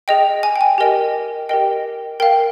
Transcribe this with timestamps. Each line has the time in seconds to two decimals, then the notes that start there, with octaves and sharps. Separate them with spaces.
0.08 G#4 D#5 G5
0.43 G#5
0.56 G5
0.61 G#5
0.78 G4 A#4 D#5 G5
1.49 G4 A#4 D#5 G5
2.20 A#4 F5 G5